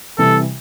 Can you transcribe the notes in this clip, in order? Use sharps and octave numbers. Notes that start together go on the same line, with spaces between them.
C3 E3 G3 A4